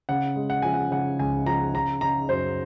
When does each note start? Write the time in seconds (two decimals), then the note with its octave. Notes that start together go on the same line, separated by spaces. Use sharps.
0.09 C#3 F#5
0.36 G#3
0.50 F#5
0.62 F3 G#5
0.74 F#5
0.91 C#3 F#5
1.19 C#2 G#5
1.46 F3 A#5
1.74 C#3 A#5
2.01 C#3 A#5
2.29 F#2 C5